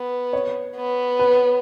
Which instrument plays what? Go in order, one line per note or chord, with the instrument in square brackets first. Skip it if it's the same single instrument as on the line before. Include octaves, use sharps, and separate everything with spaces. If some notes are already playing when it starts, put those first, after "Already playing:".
Already playing: [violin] B3
[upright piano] C#5
[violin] B3
[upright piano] B4